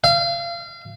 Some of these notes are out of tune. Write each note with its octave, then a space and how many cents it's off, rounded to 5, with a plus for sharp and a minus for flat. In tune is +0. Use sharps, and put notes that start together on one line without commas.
F5 -30